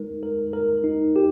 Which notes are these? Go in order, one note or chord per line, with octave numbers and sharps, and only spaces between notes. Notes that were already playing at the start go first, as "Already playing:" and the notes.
Already playing: G#3 D#4 A#4
A#4
A#4
D#4
G4